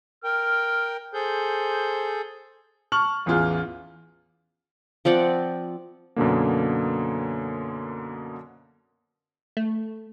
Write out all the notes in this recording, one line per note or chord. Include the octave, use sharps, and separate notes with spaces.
A#4 G5 F6
G#4 A4 C5 G6
A5 C#6 F6 F#7
A1 E2 E3 F4 G#4
F3 C4 D5 F#5
F#2 B2 D3 A#3
A3